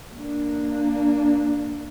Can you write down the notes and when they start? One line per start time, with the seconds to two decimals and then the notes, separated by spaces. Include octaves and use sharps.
0.16 A#3 D4